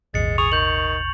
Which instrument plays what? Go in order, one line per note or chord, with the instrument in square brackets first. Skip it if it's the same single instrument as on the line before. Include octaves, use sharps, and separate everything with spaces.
[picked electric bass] D#1 G#1 [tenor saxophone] G#3 [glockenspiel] A6 C#7
[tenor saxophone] G#4 [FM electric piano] C#6 [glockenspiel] F7
[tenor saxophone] D#3 [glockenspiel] G6 F#7